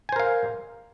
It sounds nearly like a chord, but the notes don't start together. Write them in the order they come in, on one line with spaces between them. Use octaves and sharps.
G#5 C5 A#4 F5